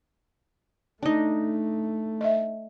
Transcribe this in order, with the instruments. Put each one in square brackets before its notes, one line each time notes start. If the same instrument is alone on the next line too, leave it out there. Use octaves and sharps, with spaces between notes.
[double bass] A3 [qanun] D4 D#4
[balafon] D#5 E5